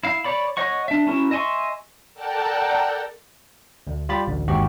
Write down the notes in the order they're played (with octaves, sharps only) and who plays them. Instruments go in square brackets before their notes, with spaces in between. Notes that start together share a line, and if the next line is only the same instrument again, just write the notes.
[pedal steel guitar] E4 F5
C#5 D5 B5
C#5 D#5 F#5 C#6
D4 E5
C#4 E4 F#4 A#4
D#5 E5 G#5 C6 C#6
[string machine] A4 A#4 D5 F#5 G5 A5
[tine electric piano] D2
G3 F4 G4 B5 A6
A1 D2
G1 D#2 G#2 F#4 G4